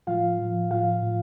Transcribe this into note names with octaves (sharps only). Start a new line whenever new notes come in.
A2 F3 F4 F5
A2 F3
A2 F3 F4 F5
A2 F3